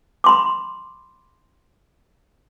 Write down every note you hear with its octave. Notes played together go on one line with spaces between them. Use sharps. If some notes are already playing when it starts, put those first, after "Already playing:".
B5 C6 D6